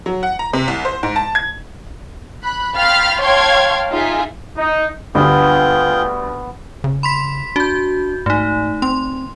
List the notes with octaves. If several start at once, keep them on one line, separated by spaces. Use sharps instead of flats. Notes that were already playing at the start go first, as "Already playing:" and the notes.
F#3
F#5
A#5
C3
C2
C5
G#2
A5
G#6
B5 F#6
F5 G5 B5 C6 F6 A6
C#5 F5 G5 A5 C6 G#6
D#4 F4 G#4 E5
D#4
D2 G2 B3 F4 G#4 G5
C#3
B5 C6 B6
D4 F#4 G6
G#2 A3 D#4
C4 C6